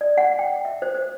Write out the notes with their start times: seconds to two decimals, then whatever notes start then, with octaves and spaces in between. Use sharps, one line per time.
0.01 D5
0.18 F#5
0.39 G5
0.65 E5
0.82 C5
0.95 C5